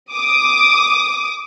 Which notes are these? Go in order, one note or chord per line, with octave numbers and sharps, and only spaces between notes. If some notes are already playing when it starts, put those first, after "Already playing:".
D6 D#6